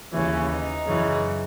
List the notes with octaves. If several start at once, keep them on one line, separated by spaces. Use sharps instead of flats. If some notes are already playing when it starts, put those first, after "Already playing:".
D#2 C#3 E3 C#4
D#4
F#2 C#3 E3